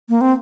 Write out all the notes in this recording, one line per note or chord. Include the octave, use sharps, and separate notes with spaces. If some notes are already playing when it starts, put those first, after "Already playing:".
A#3
C4